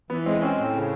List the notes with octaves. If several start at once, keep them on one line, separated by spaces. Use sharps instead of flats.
E3 B3
G#3 C4
C4 C#4
A2
C#3